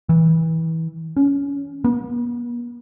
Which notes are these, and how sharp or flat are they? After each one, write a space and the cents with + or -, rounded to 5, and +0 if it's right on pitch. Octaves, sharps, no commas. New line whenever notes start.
E3 -25
C#4 +20
B3 -45